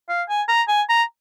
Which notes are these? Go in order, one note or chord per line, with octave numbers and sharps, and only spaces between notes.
F5
G#5
A#5
G#5
A#5